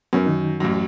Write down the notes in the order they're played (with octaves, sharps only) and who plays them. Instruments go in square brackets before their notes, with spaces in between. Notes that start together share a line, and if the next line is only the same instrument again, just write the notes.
[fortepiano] F#2 [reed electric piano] B3 C#4 A#4
[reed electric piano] D#3 D#4
[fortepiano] A1 F#2